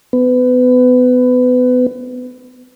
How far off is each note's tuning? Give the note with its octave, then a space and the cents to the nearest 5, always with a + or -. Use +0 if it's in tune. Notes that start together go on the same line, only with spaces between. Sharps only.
B3 +25